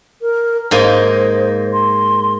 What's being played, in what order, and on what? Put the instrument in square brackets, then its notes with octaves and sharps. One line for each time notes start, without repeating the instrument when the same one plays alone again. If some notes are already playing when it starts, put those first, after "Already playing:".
[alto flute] A#4
[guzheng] G#2 A#3 D#5 [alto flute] C5
[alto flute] C6